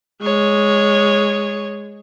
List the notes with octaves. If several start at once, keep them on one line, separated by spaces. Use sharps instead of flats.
G#3 C#5